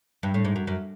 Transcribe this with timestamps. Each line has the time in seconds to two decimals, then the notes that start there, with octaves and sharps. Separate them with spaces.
0.23 G2
0.34 A2
0.45 G#2
0.56 F#2
0.67 F#2